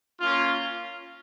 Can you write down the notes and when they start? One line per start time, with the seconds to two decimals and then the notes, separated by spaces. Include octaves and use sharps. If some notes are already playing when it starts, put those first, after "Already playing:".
0.20 A#3 C#4 F4